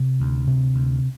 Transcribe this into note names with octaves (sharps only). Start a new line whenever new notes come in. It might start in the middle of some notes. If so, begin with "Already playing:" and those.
Already playing: C3
D2
C3
D2